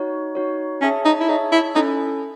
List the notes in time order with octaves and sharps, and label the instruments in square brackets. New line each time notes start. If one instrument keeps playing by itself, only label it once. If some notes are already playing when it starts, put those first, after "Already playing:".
Already playing: [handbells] D#4 F#4 C#5
D#4 F#4 C#5
[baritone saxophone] C#4 [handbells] G#4 C#5 E5 A5
[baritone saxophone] D#4
E4
[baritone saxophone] D#4 [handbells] G#4 C#5 E5 A5
[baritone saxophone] E4
[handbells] C#4 E4 A4 [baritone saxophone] D#4